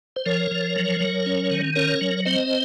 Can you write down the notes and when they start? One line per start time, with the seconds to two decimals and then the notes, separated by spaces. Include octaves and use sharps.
0.16 C5
0.26 F3 A#4 C#5
0.51 F3
0.76 F#3
1.01 F#3
1.26 C#4
1.51 D#3
1.76 C#4 A#4 C#5
2.01 F#3
2.25 C4 C5 D#5